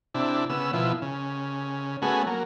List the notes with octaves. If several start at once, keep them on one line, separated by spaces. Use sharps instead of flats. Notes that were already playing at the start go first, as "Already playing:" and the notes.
C3 D4 E4
C#3 B3 E6
B2 F3 E4
C#3
A3 B3 C#4 F#4 G#4
F#3 A#3